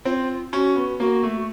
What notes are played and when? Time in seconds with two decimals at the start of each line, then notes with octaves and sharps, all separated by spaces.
0.05 C4 F4
0.53 C#4 F#4
0.76 B3
1.00 A#3 F#4
1.23 A3